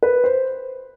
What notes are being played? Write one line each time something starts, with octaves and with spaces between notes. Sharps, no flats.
B4
C5